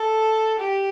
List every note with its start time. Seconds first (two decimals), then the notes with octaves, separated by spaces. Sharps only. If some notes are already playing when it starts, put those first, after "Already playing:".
Already playing: A4
0.59 G4